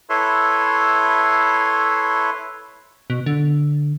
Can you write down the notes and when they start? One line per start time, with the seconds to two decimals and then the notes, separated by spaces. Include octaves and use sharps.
0.10 E4 A4 B4 C#5 E5 C6
3.10 B2
3.26 D3